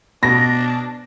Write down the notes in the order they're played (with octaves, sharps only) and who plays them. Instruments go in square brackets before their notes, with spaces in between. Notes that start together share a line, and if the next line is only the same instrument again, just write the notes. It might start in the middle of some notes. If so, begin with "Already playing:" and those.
[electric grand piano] B2 [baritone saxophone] D4 [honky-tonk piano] A#6